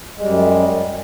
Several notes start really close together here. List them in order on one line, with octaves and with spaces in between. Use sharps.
G#3 G3 F#2